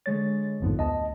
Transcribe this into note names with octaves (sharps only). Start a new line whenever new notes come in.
D3 G#3 C#5 A6
A#1 F2 G#2 D3 F3 B3
D2 D#5 A5